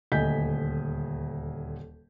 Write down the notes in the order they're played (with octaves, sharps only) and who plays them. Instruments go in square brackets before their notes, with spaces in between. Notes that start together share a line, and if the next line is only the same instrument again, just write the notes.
[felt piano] D#1 D2 D#5 G#5 G6 B6